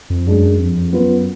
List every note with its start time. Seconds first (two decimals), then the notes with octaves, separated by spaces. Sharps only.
0.10 F2
0.27 F#2 G#3 D4 G#4
0.60 F2
0.93 F#2 B3 F4 B4